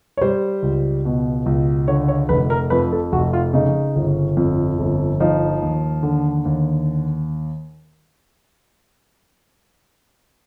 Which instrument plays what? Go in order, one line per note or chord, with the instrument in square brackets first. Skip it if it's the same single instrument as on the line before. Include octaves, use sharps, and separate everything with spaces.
[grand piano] C#5
G3 C5
C#2
B2
C#2
D3 C#5
C#5
F1 B4
A#4
F2 B4
A4
F1 F#4
F4
C#3 D#4
G1
F2
G1
F3 D#4
D#2
D3
D#2